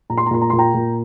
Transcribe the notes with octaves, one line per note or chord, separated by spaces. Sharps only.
A#2 A#5
C6
A#5
A#2 C6
A#5
A#2 C6
G5 A#5
A#2